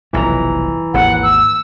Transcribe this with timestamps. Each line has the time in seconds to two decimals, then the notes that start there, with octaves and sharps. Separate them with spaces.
0.13 F1 B1 G2 E3 A#5
0.94 G#1 D#2 G#2 F#5
1.23 E6